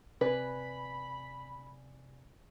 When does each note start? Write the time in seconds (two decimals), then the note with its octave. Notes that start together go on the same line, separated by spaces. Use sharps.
0.21 C3 B4 D5 G#5 B5